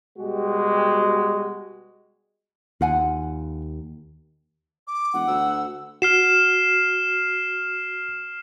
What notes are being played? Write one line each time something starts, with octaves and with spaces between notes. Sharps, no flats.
B2 G3 G#3 F#4 G4
D#2 F4 F#5 G#5
D6
E1 F#5
D2 E6
F#4 F6 C7 E7